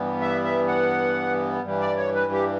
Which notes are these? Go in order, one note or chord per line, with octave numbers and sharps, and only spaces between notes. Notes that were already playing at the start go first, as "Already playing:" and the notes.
Already playing: G2 E3 G3 B3
E5
E5
F#5
G2 E3 G3
D5
C#5
B4
G4